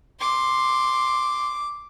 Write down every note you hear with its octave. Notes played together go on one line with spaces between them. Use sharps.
C6 D6